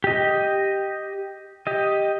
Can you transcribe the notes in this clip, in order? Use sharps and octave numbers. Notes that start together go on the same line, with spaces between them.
G4 D#5
G4 D#5